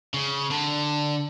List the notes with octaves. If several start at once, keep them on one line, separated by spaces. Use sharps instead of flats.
C#3
D3